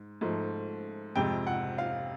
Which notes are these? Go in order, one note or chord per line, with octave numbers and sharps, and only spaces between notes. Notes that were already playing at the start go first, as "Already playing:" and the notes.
Already playing: G#2
G#2 F3 A3
F2 C3 F3 G#3 G5
F#5
F5